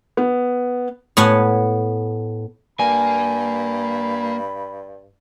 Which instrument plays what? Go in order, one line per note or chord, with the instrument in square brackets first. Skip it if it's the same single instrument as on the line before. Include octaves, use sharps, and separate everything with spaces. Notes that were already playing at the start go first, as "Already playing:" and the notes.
[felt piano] B3
[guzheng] A2 B3 F#5 G#5
[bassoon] G2 [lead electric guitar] A#3 [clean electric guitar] G#5 [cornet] B5